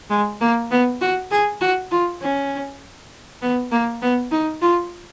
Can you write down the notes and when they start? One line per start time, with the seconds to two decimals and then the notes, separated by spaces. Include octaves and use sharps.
0.10 G#3
0.41 A#3
0.71 B3
1.01 F#4
1.31 G#4
1.61 F#4
1.91 F4
2.21 C#4
3.42 B3
3.72 A#3
4.02 B3
4.31 D#4
4.62 F4